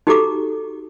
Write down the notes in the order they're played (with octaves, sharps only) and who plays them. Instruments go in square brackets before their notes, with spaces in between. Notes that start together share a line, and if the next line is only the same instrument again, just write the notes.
[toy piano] D#4 F#4 G4 A4 A#5 D6